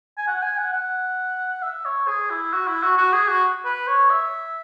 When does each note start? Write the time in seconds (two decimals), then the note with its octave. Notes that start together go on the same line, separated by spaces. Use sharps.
0.18 G#5
0.28 F#5
0.43 G#5
0.58 F#5
0.73 F#5
1.62 E5
1.85 C#5
2.08 G#4
2.30 E4
2.53 F#4
2.68 E4
2.83 F#4
2.98 F#4
3.13 G#4
3.28 F#4
3.65 B4
3.88 C#5
4.10 E5